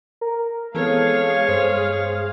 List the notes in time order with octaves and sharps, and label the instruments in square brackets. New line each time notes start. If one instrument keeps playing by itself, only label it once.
[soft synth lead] A#4
[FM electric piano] E3 B3 C4 [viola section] G#3 G#4 F5 [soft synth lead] A4 [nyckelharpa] C#5
[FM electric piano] G2 [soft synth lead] C5